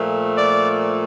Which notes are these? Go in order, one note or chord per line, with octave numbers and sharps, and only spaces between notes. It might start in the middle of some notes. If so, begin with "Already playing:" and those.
Already playing: A#2 F3 A3
D5